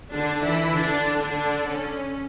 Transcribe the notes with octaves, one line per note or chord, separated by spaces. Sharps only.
D3 D4
E3 E4
D3 D4
D3 D4
C#4